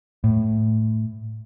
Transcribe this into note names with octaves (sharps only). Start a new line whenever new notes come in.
A2